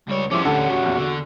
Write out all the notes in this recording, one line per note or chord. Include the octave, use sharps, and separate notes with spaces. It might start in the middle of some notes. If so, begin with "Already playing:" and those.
C#2 G3 C#5
F3 G3 G#3 C#4 E4 C6 D6
D2 D3 D4 A4 F#5
F#4
A#1 E2
D3